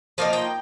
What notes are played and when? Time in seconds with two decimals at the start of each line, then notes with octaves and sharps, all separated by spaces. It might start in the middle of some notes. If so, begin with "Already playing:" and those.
0.18 F3 A#3 D#4 F5
0.33 G5